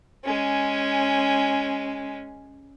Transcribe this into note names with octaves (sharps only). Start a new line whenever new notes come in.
G#3 C#4